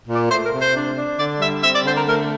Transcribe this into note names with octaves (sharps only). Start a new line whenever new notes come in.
A#2
D5
A3 C5
A#4
C3
C5
D4
D4
D3 D5
G3 E5
C4 E5
D5
D3 C5
A#4
A3 A#4